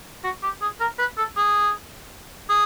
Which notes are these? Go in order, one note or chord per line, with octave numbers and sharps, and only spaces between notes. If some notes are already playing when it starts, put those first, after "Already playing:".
F#4
G4
G#4
A#4
B4
A4
G#4
G#4